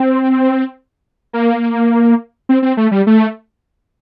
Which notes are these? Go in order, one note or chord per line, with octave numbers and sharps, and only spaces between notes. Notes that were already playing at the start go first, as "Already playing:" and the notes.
Already playing: C4
A#3
C4
C4
A3
G3
A3